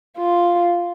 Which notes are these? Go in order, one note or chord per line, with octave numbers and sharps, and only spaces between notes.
F4